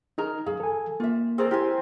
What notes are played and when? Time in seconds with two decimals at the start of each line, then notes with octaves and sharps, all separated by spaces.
0.18 D#4 G#4 A#4 A#5
0.46 F#2 G#4 F5
0.60 A4 G#5
1.00 A#3 F4 E5
1.38 C4 G#4 A#4 C5 D5
1.51 E4 G4 A#4 G#5